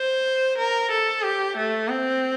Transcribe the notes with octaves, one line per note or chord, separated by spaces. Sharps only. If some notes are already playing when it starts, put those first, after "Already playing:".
Already playing: C5
A#4
A4
G4
A3
C4